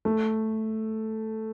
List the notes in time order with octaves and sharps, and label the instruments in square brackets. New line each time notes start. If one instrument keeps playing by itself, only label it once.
[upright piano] A3